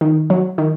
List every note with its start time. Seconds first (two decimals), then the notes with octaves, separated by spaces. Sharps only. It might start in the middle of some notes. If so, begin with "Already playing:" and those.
0.01 D#3
0.30 F#3
0.58 D#3